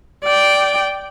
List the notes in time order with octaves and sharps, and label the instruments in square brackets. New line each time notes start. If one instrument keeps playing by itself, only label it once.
[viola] D5 G5